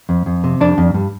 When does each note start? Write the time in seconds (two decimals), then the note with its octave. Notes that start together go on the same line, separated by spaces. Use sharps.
0.09 F2
0.26 F2
0.44 C3
0.61 F2 D4
0.78 F2
0.94 G2